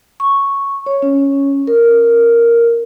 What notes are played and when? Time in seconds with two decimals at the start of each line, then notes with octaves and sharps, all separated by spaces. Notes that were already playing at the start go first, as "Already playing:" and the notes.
0.20 C#6
0.86 C#5
1.02 C#4
1.67 A#4